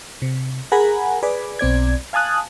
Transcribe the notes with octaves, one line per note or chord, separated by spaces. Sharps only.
C3
G#4 A#4 F#5 G#5 A#5 B5
G#4 B4 D5
B1 C4 D5 G#6
F5 G#5 A5 D#6 F#6